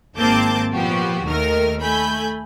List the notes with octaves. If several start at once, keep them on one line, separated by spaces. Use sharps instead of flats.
G#1 A#3 C4 A5 D6 G6
A#2 F3 B3 F#4 G4
D#2 D#3 A3 A#4 F6
A3 G#5 B5 G6